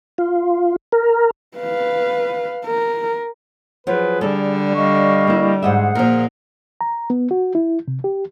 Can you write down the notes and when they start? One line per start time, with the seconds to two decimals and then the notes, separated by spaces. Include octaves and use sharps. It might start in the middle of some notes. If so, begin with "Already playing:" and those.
0.18 F4
0.92 A#4
1.57 B4 F5
2.66 A#4
3.87 F3 F#3 G#4 B4
4.21 D3 G3 A4
4.75 G3 D#5 F5 C#6
5.27 A#3 E4
5.62 G#2 G#4 C5 D#5 E5 F#5
5.95 A#2 F3 A#3 A#4
6.81 A#5
7.10 B3
7.31 F#4
7.55 E4
7.88 C3
8.04 G4